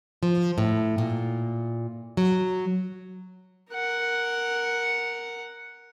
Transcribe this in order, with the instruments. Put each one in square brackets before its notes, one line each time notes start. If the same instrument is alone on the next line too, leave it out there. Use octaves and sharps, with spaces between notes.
[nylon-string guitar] F3
A2
A#2
F#3
[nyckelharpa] A#4 F#5